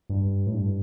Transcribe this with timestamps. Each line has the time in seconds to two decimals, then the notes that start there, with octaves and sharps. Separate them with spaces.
0.09 G2
0.47 A2
0.53 G2